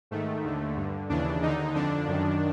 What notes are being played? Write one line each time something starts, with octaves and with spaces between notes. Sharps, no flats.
G#2 D#3 A3
D#2 D3
G2 D3
D#2 C#3 E3 D4
D#2 D3 D#4
F2 D3 D4
F#2 D#3